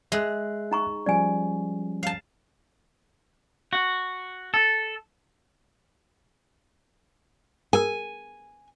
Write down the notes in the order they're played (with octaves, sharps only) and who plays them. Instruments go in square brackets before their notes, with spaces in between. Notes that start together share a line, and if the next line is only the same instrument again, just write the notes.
[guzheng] G#3 [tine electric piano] E5 F#6
[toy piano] D#4 A#5 C#6
[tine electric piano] F3 G3 C#4 [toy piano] D5 G#5
[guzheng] F5 A5
[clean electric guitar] F#4
A4
[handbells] G#4 A#4 E6 [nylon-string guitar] G#5